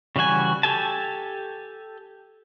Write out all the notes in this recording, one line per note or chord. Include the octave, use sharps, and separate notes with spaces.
C#3 E3 G3 F#4 G#5
G4 A4 G#5 A5